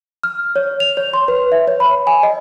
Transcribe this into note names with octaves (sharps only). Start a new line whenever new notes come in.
F6
C#5
F7
C#5
C6
B4
E5
C#5
B5
G#5
D#5